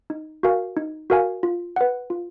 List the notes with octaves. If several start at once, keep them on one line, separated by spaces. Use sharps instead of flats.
D#4
F#4 A#4 F5 G#5
D#4
F#4 A#4 F5 G#5
F4
B4 F#5
F4